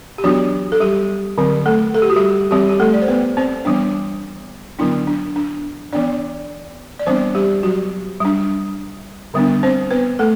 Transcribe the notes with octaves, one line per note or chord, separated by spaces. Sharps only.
G4
E3 F#3 B3 D4 F#4
A4
G3 G4
D3 F#3 C4
A3 A4
A4
G4
F#4
G3 G4
E3 G3 C4 G4
G4
A3 A4
D5
C5
B3 B4
C4 C5
E3 G3 B3 D4
D3 F#3 B3 D4 E4
D4
D4
E3 B3 D4 D5
D5
E3 G3 B3 C4 D4 C5
G3 G4
F#3 F#4
G3 D4
D3 G3 B3 D4
C4 C5
B3 B4
A3 A4